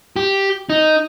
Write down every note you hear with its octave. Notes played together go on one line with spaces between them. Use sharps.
G4
D#4